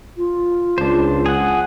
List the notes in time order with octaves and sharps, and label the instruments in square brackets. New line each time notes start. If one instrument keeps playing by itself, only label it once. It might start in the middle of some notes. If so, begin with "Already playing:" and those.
[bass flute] F4
[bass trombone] C#2 [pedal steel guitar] D4 C5
[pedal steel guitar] G#4 F#5